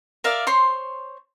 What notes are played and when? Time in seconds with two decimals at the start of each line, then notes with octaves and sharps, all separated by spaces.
0.24 A#4 D5 E5 F5
0.47 C5 C#5 C6